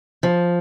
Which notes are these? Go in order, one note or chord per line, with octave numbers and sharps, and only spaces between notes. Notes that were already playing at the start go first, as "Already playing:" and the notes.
F3